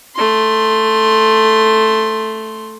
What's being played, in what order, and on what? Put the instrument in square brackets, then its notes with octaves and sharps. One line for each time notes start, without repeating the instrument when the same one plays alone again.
[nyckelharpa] A3 C6